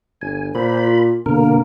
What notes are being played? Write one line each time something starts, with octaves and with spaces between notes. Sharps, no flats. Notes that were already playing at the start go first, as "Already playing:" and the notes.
G1 G#5
A#2 C5 B5
F4
G1 B2 D3 A#3 A#4